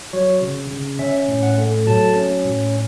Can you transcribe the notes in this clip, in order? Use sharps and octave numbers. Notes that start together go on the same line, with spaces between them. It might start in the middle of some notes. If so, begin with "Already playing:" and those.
F#3 C#5
C#3
C#3
C#4 E5
A2
F#5
A3
F#3 A5
C#4
A2